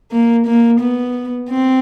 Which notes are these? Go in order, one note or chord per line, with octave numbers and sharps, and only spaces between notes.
A#3
A#3
B3
C4